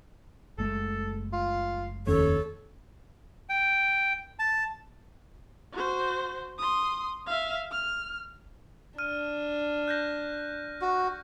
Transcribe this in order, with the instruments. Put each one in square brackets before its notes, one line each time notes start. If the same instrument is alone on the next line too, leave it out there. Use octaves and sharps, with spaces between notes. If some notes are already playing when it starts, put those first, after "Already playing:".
[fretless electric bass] F#1 G#3 A3 [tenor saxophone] A4
[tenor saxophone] F4
[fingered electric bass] F1 D#2 C#4 [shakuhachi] A4 [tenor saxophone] C#5
[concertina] G5
A5
[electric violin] F#4 C5
C6 D#6
E5 F5
F6
[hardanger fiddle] D4 [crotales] F6 D#7
[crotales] F#6 G6 A#6
[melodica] F#4